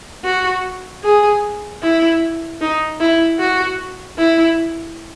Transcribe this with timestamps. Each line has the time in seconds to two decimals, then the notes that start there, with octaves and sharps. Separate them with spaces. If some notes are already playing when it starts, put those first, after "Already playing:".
0.24 F#4
1.03 G#4
1.83 E4
2.61 D#4
3.00 E4
3.40 F#4
4.18 E4